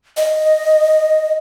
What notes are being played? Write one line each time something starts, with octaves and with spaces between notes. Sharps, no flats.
D#5